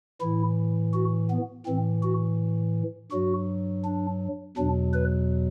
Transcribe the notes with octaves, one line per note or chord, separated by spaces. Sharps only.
A2 E3 E4
F#4
B3
A2 E3 C4
F#4
G2 F#3 F#4
D4
E2 B2 F#3 D4
B4